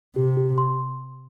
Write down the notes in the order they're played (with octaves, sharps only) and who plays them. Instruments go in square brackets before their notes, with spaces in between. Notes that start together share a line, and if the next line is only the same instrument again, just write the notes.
[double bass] C3 [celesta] G4
[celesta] G4
C6